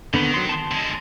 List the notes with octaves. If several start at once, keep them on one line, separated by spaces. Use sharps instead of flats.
D3 D#3 B3 B4
F#3 C6
A5 C6
D3 G#3